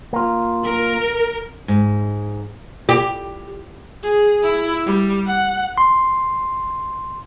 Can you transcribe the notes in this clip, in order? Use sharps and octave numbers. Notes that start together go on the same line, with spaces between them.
A#3 F4
A#4
G#2
G4
G#4
E4
G3
F#5
C6